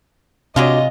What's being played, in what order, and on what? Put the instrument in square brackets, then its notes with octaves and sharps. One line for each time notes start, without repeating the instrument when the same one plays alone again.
[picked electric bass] C3 [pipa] F#3 G#3 F4 [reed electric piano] D4 F#4 D6 [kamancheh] D#5